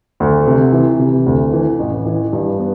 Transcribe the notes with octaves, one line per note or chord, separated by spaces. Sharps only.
D2
C3
E3
C3
D2
E3
A1
E3
G2
B3